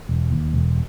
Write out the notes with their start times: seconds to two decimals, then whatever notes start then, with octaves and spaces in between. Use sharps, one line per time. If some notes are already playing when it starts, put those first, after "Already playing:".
0.09 E1
0.31 D#2
0.53 E1